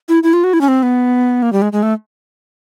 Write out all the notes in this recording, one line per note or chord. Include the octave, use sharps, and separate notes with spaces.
E4
E4
F4
F#4
E4
C#4
C4
B3
A#3
G3
G#3
G#3
A3